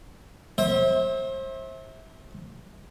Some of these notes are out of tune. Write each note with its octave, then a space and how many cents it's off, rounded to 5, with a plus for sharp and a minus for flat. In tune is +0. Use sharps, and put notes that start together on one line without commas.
C5 +35 E5 -25